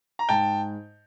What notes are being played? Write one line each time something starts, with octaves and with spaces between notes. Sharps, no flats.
A#5
G#2 G5 A5